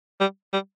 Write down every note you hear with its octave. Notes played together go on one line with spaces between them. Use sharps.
G3
G3